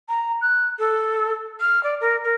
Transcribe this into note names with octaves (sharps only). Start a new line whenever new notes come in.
A#5
F#6
A4
F6
D5
A#4
A#4